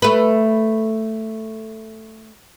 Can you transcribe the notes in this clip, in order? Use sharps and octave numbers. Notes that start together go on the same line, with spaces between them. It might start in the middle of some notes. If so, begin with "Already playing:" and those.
A3 B4